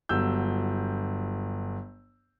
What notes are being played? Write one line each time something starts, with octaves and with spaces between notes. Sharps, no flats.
G1 F#3 E6 G6